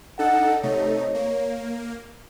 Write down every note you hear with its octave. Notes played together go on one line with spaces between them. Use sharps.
D4 D#4 A4 F#5
C3 A3 D#4 C#5
A#3